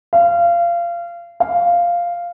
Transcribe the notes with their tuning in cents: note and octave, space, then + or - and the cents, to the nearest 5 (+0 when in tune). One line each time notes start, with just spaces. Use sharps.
F5 -25
F5 -5